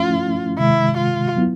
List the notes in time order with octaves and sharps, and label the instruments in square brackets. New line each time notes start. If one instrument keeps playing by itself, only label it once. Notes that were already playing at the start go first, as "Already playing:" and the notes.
Already playing: [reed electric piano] F3 A3 C#4 E4 [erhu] F4
[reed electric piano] C3 D#3 G#3 [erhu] E4
[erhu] F4
[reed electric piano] F#3 B3 E4